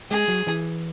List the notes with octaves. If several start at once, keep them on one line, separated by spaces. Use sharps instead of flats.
G#3 G#4
F#3
E3